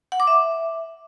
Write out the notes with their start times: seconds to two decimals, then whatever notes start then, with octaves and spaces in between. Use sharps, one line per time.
0.12 F#5
0.20 D6
0.27 E5